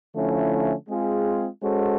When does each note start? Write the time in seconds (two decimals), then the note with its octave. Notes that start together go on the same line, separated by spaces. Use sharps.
0.14 D3 F3 A3 C#4 E4
0.89 G#3 C4 F4 G#4
1.63 G#3 C#4 F#4 A4 C5